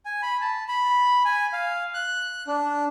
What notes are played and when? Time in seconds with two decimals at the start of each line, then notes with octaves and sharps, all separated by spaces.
0.06 G#5
0.22 B5
0.41 A5
0.68 B5
1.25 G#5
1.53 F5
1.94 F#6
2.47 D4